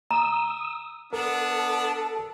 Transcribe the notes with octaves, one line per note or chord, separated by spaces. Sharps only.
A#5 D#6 E6
B3 D4 A4 A#4